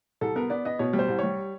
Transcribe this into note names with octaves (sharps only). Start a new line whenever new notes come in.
C2 A4
B3 A#4
B3 D5
B3 D#5
B2 C#5
G3
C5
C2
G3 C#5